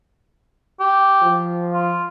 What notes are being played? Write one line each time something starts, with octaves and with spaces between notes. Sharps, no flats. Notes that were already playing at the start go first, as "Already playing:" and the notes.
G4
F3
F4